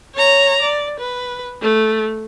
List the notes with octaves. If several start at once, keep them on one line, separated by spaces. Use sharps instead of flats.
C#5 A#5
D5
B4
A3